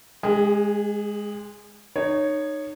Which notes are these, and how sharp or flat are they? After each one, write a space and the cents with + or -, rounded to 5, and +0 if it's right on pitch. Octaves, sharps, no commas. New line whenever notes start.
G#3 +0 G#4 -45
D#4 -25 C#5 +0